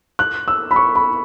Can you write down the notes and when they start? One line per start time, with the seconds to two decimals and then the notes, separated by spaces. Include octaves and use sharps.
0.19 F#6
0.48 E6
0.71 B5
0.76 C#6
0.96 B5